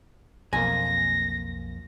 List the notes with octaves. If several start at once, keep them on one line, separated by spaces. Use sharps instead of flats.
B1 F2 A#3 G#5 A#6